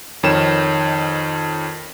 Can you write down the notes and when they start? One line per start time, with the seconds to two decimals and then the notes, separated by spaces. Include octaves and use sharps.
0.23 F2 D#3 A#4 C#5 E7